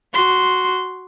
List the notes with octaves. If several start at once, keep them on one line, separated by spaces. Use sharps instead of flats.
F#4 C6